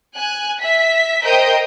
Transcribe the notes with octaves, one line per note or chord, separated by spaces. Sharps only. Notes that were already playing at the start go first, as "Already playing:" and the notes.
G#5 F#6
E5 B6
A#4 C5 D#5 G5 D#6 G6